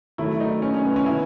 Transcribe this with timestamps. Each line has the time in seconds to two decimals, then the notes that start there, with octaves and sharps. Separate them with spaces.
0.18 D#3 F#3 A3 E4
0.40 D#4
0.62 C#4
0.74 C#4
0.85 B3
0.96 C#4
1.06 D#3 E4